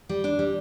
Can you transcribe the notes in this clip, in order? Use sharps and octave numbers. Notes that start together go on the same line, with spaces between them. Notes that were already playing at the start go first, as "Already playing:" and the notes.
G3
D4
G3